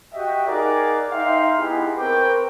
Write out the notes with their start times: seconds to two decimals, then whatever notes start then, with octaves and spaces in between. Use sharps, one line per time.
0.14 F#4 G4 D#5 E5 G5
0.47 D#4 G#4 A#4 D5 F#5 D6
1.11 D#4 E5 F5 G5 C6
1.58 B3 D#4 E4 G4 G#4
1.98 C4 A#4 B4 G5 C#6 D6